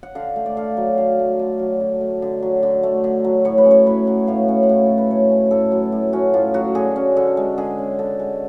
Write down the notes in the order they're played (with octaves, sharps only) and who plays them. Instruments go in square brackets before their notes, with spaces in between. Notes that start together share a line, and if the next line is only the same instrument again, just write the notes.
[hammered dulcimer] F#5
D3 F5
A3
D5
D3 F5
F#3
D3 F5
A3
D3
F#3
D3
A3
D3
F#3
D3
A3
D3
F#3
A2 C#5
B4
C#4 C#5
A2 B4
F#3
A2 F5
C#4
F#5
A2 F5
F#3 A4
B4
A2 C#5
C#4
A2 A4
F#3
A2
C#4 F#4
A2 F4
F#3 F#4
D3 G#4
C#4
D3 A4
G#3
D3 G#4
C#4
D3 A4
G#3